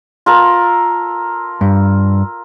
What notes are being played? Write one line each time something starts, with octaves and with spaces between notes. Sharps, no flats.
F4 A4 A#4
G2